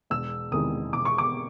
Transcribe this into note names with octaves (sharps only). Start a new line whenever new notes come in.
E1 E6
E2 C3 D#3 G#3 D#6
E1 D6
C#6
D6